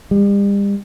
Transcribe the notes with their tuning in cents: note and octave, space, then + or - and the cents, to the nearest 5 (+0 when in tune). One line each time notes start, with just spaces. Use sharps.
G3 +40